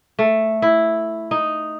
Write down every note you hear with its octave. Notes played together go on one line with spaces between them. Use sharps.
A3
E4
D#4